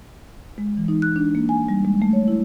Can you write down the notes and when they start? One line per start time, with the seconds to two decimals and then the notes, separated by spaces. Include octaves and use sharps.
0.58 G#3
0.77 E3
0.88 D#4
1.02 F#6
1.16 D4
1.35 A#3
1.49 G#5
1.69 G3
1.85 G#3
2.02 A3
2.13 C#5
2.28 E4